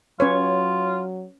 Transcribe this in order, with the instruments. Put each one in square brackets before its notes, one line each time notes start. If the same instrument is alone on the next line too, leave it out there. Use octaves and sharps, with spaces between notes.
[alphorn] F#3 [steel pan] C#4 B4 C#5 [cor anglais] F4